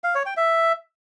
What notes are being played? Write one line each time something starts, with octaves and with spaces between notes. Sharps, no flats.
F5
C#5
G5
E5